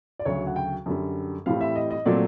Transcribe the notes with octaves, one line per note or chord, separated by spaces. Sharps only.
D5
D2 C#3 F#3 C#5
F#5
G5
F#2 D3 G3
A2 E3 G3 C4 F5
E5
D#5
D#5
A#2 F#3 A3 C4 D5